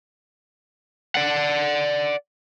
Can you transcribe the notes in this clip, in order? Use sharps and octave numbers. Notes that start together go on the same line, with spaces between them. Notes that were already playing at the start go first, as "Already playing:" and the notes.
D5 F#5